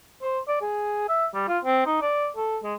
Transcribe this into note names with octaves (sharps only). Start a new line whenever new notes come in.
C5
D5
G#4
E5
G3
F4
C4
D#4
D5
A4
G#3